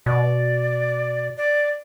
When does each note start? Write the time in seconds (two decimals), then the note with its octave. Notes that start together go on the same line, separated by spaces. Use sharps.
0.06 B2 D5
1.37 D5